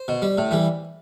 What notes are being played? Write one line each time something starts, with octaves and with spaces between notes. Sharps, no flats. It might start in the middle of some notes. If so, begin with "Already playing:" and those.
Already playing: C5
B2
G3
A2
E3 G3